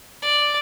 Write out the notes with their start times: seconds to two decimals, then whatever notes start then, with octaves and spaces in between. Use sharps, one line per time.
0.22 D5